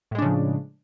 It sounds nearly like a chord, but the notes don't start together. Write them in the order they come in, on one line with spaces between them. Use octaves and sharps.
A2 G#3 D4 C#3 F3